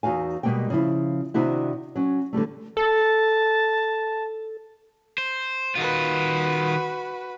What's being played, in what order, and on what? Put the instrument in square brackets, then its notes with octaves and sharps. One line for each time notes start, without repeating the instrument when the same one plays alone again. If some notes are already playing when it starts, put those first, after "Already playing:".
[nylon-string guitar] E2 D#4 F#4 F5 G#5
B2 G3 G#3 A#3 G5
C#3 F3 E4
C3 D#3 D4 E4 F#4
F#3 C#4
D3 E3 G3 A3
[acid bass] A4 [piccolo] A5
[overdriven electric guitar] C5
[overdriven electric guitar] D#3 F4 [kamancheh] F#4 B4